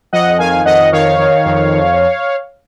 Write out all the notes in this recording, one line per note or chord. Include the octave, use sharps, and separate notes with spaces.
F2 D#5 F#5
D#3 F5 G#5
F2 D#5 F#5
D#3 C#5 F5
D#3
F2